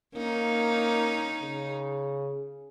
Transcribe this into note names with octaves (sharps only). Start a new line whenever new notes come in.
A#3 C#4 D#4
C#3